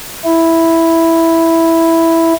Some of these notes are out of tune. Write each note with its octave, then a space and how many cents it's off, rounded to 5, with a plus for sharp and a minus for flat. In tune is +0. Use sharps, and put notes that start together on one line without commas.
E4 +0